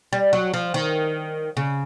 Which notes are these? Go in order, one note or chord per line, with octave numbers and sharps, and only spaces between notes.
G3
F#3
F3
D#3
C#3